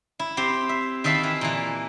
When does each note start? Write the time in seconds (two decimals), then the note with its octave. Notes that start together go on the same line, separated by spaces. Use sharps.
0.19 E4
0.37 C4 G4
0.69 E5
1.04 D#3 A4 E5 F5 B5
1.23 E3
1.41 A#2 E3